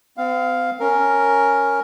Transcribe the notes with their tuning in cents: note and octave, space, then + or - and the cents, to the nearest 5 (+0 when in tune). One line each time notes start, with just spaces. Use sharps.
C4 -40 F5 +0
C#4 +0 A#4 +0